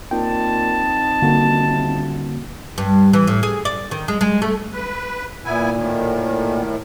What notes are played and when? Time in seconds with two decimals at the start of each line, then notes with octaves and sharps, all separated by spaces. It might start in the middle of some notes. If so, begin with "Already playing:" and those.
0.11 A#2 C4 D#4 G5 A5
1.22 D#1 D3 A#3 F#4
2.78 G2
3.13 E3
3.27 A2
3.43 G#4
3.65 D5
3.91 D#3
4.08 G#3
4.21 G#3
4.42 A3
4.73 B4
5.45 A#2 B3 E4 G#5
5.75 A2 D#3